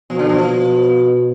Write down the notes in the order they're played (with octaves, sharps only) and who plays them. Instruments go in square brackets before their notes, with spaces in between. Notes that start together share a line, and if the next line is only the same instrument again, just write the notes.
[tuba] B2 [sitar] F3
[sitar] D3
F3
[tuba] B2